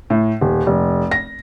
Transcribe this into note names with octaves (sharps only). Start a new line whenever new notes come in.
A2
D#1
F1
A#6